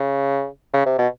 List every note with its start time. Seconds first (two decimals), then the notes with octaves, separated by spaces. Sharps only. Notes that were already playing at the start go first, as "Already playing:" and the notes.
Already playing: C#3
0.73 C#3
0.86 C3
0.98 B2